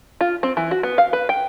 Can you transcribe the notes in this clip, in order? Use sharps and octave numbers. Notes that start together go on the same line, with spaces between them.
F4
C4
E3
F#4
B3
F5
B4
G5